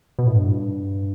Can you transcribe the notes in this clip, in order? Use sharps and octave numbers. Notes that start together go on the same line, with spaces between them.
B2
A2
G2